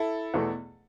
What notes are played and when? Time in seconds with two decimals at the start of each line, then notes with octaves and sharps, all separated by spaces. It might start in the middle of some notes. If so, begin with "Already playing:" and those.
Already playing: E4 A4
0.34 E2 B2 A3